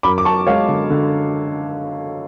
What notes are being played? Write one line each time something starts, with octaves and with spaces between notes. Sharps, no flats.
F#2 B5 D6
D6
F#2 A5 C#6
G#3 C#5 F5
D3
D3